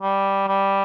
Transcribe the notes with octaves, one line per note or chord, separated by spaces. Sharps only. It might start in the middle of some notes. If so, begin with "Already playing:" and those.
G3
G3